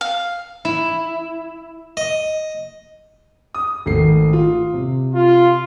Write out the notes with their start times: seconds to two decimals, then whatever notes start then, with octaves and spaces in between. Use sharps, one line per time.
0.01 F5
0.65 E4
1.97 D#5
3.55 D#6
3.86 G#1 A3 C7
4.33 F4
4.73 C3
5.14 F4